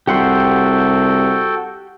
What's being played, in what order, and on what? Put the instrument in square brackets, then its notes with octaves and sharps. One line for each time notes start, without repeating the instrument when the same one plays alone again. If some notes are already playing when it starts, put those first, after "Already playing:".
[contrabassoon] C2 [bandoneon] F#4 A4 G5 [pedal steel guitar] G4 F#5 C6